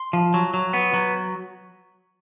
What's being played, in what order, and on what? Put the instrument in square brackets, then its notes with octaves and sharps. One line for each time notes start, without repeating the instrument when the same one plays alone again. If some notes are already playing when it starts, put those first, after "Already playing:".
Already playing: [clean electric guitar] C6
F3
F#3
F#3
B3
F#3